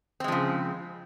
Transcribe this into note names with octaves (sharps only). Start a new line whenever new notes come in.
C#3 F3 G#3 C4